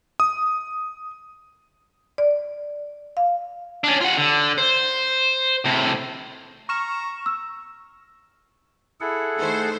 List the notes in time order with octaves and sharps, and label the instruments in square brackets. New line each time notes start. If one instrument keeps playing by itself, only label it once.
[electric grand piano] D#6
[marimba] D5
F5
[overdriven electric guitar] C#4 D4
F4 F#5
D3
C5
A2 C3
[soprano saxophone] A#5 [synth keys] C#6 F6 E7
[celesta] E6
[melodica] E4 [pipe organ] G#4 A4 F#5
[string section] D#3 A3 C5